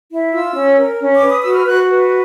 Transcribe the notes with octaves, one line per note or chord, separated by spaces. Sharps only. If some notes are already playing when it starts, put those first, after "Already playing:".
E4
F4 E6
C#4
A#4
C#4
D6
B4
D#6
F#4 E6
F6
F#4 F#6
B4